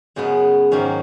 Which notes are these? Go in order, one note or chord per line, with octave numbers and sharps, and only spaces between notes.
F#2 C#3 G#3 B3
G#2 D#3 F#3 A#3 C#4